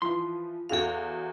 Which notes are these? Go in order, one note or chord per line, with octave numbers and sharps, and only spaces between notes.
E3 F3 C6
E2 F#4 G#4 A4 F5